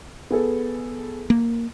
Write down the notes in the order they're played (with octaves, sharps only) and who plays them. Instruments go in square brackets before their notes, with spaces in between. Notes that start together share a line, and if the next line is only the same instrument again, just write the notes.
[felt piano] B3 G#4 A4
[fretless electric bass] A#3